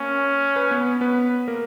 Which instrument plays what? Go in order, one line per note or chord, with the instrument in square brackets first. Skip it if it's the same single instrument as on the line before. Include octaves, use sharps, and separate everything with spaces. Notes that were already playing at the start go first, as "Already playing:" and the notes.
Already playing: [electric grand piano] A#3 A#4 [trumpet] C#4
[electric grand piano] B4
B3 B4
B3 B4
A#3 A#4